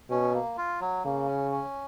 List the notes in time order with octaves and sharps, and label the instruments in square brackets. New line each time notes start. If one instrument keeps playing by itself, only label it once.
[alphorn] B2 [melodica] C#4
[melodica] A#3
F4
F#3
[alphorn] C#3 [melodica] A#3
[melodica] C#4
C#4